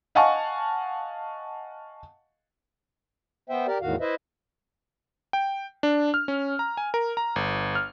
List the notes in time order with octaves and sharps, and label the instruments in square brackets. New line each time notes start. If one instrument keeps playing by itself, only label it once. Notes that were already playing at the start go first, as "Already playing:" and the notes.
[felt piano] D#5 F5 F#5 G#5 A5 C#6
[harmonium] B3 C5 E5 G5
G4 A#4 D5
E2 A2 D#3 F#4 F5
E4 B4 C5 D#5 E5
[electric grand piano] G5
D4
F6
C#4
A#5
G#5
A#4
A#5
G1
F6